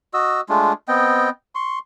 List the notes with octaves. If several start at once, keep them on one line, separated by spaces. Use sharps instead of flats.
F#4 D#5 E6
G#3 A3 D4 F4
B3 C4 D#5 G5
C6 C#6